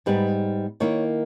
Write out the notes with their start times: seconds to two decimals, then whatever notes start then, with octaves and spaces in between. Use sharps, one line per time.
0.06 G#2 G3 B3 D#4 B4
0.80 D#3 A#3 E4 C#5